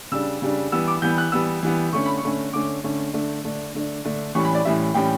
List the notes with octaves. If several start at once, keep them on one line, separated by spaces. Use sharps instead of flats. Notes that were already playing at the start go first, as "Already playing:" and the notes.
C#3 G3 D4 E6
C#3 G3 D4
E3 G3 B3 E6
D6
E3 G3 B3 G6
F#6
E3 G3 B3 E6
E3 G3 B3
D3 A3 C#4 C#6
B5
C#6
D3 A3 C#4
D3 A3 C#4 D6
D3 A3 C#4
D3 A3 D4
D3 A3 D4
D3 A3 D4
D3 A3 D4
A2 E3 G3 C#4 C#6
B5
D5
A2 E3 G3 C#4 E5
A2 E3 G3 C#4 G5